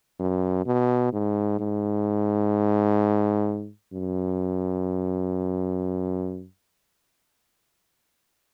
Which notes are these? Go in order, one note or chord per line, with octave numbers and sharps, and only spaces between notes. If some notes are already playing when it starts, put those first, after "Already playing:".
F#2
B2
G#2
G#2
F#2